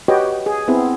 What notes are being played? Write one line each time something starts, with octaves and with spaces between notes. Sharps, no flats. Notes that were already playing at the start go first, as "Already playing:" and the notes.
F#4 G4 B4 C#5 D#5 G5
G#4
B3 C4 E4 G#4